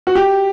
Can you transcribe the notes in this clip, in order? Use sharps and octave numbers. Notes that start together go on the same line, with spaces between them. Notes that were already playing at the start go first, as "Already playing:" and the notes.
F#4
G4